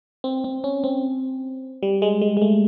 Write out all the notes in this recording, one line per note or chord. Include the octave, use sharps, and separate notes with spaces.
C4
C4
C#4
C4
G3
G#3
G#3
G#3
A3